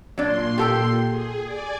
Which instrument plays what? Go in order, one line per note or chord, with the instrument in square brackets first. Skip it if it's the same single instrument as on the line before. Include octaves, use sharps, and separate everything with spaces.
[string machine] A#2 C6 [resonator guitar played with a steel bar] F#3 D4
[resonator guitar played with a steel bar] G4 A4 G5
[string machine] G#4
D5 G#5